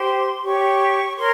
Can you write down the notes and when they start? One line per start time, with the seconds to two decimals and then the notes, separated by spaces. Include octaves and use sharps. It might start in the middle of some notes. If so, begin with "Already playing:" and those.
Already playing: G4 C5 C6
0.43 G4 C#5 C#6
1.17 A#4 C#5 C6